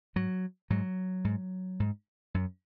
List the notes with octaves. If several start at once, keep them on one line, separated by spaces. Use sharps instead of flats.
G#2 F#3
G#2 F#3
G#2
G#2
F#2